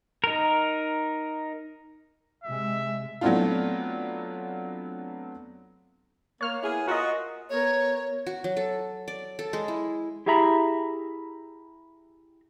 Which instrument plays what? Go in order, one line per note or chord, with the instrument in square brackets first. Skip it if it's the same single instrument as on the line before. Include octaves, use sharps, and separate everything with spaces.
[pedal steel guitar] D#4 A#4
[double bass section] C3 G#3 [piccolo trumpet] E5
[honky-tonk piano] F#3 A3 B3 C4 D4 F4
[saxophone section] A#3 [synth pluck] C#5 F6
[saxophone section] B3 E4 G#4
[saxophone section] F4 F#4 [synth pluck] A#4 D#5
[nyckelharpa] B3 A#4 [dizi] C#5
[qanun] F#4
F#3
A4
D5
A4
G#3
E4
[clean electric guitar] E4 G4 G#4 E5 A#5 B5